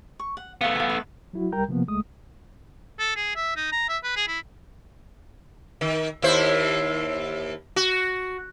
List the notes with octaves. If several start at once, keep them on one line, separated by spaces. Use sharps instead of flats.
C#6
F#5
A3 B3 F5 F#5
F5 G#5
B4
F#3 E4 F#4
C2 G3 A#4 G5 A#5 G6
C3 F3 A#3 B3
C#2 G#3 A3 D#6
A4
G#4
E5
D#4
A#5
E5
B4
G#4
E4
D#3
D#2 E4 C5
F#4